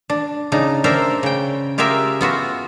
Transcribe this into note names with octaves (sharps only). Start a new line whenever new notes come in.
D4
C#3 D4 D#4
D4 A#4 C5 E5 G5
C#3 G5
F4 G4 G#4 A#4 E5
B3 F4 F#4 E5